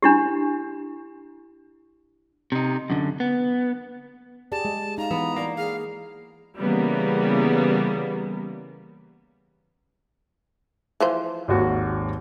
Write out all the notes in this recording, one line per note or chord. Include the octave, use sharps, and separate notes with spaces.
D4 E4 G4
C3 D#4
F#2 D3
B3
G4 G#4 D5 A5
G#3
D#4 F5 A#5
E3 B3
A#3 D5
G#4 F5
C#3 E3 G3 A#3 B3
E3 F3 C5
G#1 D#2 F#4